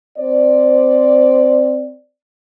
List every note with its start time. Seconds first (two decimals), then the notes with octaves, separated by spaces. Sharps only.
0.19 C4 C5 D5